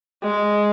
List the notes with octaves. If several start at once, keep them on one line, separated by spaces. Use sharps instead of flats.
G#3